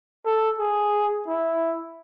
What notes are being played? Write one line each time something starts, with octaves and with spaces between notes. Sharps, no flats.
A4
G#4
E4